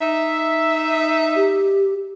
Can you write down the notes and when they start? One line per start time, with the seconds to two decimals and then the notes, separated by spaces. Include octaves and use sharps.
0.01 D#4 E5
1.36 G4